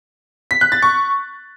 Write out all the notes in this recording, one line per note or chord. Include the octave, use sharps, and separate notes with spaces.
B6
F#6
A6
C#6